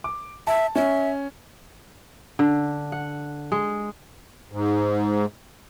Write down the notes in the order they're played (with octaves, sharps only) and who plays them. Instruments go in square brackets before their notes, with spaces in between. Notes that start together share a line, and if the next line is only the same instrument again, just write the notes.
[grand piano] D6
[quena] E5 [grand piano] A5
[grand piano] C#4 [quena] E5
[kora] D3
F#5
G#3
[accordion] G#2